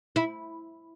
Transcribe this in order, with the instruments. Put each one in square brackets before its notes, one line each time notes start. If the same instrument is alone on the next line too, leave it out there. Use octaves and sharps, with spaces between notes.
[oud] E4